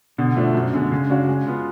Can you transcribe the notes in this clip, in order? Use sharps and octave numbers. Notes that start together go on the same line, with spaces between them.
B2 D3
F3 A3 D4
F#2
D3 G#3
C#3 G#3
D4 F#4 C#5 F5
G#3
B3 F4